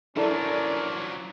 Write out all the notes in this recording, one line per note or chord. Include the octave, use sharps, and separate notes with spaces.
F3 F#3 C#4 D4 E4 A4 A#4 D5